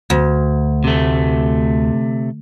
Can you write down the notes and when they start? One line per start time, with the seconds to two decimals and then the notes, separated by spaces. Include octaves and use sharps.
0.10 D2
0.84 C3 A3